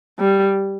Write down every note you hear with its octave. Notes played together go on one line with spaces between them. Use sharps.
G3